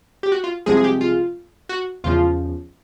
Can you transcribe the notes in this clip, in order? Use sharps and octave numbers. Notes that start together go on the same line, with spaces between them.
G4
F#4
F4
C2 C3 F3 G#3 G#4
G#4
G4
F4
F#4
E2 C#3 F3 F4